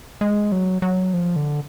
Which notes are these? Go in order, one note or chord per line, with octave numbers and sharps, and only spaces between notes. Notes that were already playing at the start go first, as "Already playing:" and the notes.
G#3
F#3
F#3
F3
D3